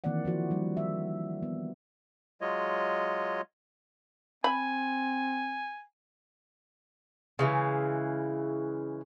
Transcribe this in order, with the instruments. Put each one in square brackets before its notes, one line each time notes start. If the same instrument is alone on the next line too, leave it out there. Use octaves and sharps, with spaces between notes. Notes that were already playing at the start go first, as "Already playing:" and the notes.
[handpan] D#3 E3 A#3 C4 D5 F#5
F3 E4 F#4 C5
F3 G3 D4
E5
B3
[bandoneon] F#3 G#3 F4 C#5 D#5
[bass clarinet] C4 [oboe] G#5 [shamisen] B5
[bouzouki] C#3 E3 G#3